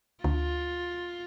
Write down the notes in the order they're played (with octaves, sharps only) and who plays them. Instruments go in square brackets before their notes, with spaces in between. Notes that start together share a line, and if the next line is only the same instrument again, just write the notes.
[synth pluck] D2 [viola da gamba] F4